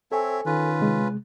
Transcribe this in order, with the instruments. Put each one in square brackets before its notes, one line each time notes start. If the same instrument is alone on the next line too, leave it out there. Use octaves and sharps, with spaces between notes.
[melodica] C4 C#5 E5 [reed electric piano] A4 G#5
[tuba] D#3 [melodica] C#4 F4 B4
[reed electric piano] C3 G#3